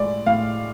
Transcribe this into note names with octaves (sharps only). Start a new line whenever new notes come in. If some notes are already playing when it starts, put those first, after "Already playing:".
Already playing: A2 G#3 D5
A2 F5